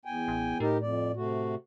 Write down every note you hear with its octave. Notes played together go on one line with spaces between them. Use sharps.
E2 G5 G#5
A1
A2 D#4 G4 A#4
F2 D5
C3 A3 F#4